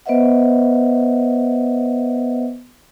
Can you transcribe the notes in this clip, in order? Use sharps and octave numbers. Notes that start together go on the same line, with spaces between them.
B3 B4 C5 D#5 E5 F#5